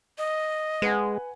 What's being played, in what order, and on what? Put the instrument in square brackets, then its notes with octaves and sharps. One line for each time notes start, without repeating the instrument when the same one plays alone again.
[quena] D#5
[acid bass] G#3 [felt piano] B4 F#5 G#5